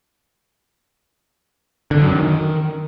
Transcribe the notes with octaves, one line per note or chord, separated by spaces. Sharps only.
D3
F#2
D#3